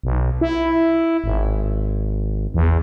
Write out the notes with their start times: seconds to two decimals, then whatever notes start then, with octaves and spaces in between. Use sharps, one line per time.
0.03 B1
0.41 E4
1.24 G#1
2.54 E2